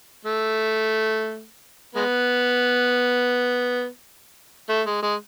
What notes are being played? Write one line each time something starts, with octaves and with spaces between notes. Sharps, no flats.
A3
G#3 B3
A3
G#3
G#3